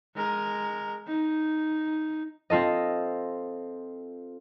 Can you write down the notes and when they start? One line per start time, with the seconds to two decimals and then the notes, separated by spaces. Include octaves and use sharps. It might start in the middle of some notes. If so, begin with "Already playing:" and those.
0.16 G#3 A#4
1.07 D#4
2.50 C4 F4 A4 D#5